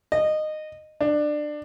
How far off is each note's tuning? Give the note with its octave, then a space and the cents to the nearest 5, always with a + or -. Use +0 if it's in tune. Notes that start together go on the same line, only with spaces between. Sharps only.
D#5 -15
D4 +20